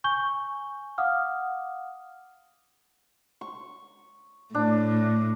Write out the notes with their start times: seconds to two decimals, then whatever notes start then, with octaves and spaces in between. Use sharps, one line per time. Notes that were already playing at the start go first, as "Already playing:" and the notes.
0.04 G#5 C#6 G6 G7
0.98 F5 F#5 D6 D#6 F6
3.41 C#6
4.55 A2 D4